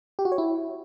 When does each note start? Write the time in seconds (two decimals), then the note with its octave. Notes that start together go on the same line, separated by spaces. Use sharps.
0.19 G4
0.25 F#4
0.32 C#5
0.38 E4